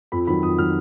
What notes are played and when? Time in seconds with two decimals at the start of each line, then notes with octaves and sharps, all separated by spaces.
0.12 F2 B5
0.27 D#3 F#3 B5
0.43 F2 D#6
0.58 D#3 F#3 F6